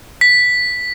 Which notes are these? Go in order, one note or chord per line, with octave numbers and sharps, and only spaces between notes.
B6